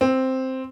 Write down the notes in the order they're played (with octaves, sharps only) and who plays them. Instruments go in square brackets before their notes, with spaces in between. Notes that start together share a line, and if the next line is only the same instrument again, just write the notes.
[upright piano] C4